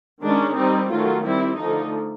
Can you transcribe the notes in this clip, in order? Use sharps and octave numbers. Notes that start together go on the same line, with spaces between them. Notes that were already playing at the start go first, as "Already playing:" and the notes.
D#3 G#3 C#4 D4
G3 C4 D#4
D#3 F#3 A3 F4
G3 C4 E4
D3 F3 A3 D#4